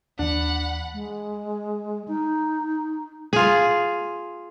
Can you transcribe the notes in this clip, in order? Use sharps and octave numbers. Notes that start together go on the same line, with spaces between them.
D#2 E3 D4 F#5 B5
G#3
D#4
F4 G#4